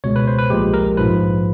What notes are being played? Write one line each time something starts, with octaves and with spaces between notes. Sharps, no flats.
C#2 B2 G#3 C#5
B4
C5
B4
B1 A#2 F3 G#3 G4
A#4
A#1 G#2 F3 B4